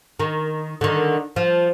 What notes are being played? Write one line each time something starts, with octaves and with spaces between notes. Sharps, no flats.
D#3
D3 D#3
F3